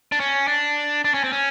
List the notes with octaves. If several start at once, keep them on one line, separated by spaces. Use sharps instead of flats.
D4
C#4
D4
D4
C#4
C4
C#4